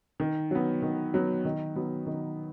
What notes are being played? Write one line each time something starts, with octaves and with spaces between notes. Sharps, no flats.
D#3
F#3 B3
D#3
F#3 B3
D#3
F#3 B3
D#3